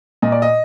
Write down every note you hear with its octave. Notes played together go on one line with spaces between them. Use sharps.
A#2 D#5
D5
D#5